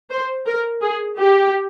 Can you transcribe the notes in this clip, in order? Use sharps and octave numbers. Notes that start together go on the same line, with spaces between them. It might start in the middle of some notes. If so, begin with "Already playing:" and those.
C5
A#4
G#4
G4